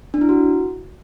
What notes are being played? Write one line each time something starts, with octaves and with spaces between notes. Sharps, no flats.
D4
E4
F#4